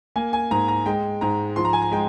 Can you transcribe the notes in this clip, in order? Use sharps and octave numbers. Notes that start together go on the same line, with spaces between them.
A#3 G#5
G#5
G#2 A#5
A#5
G#3 G5
G#2 A#5
F3 C6
A#5
G#5
A#5
G#3 G5